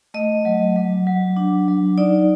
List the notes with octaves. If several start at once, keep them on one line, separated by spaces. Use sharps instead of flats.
A3 D#5
F#3
F#3
F#3
D4
F#3
D#4 D5